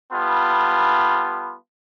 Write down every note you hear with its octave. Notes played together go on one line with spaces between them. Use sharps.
G3 B3 F4 A4